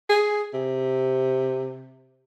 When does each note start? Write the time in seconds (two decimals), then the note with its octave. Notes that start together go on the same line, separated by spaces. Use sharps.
0.09 G#4
0.54 C3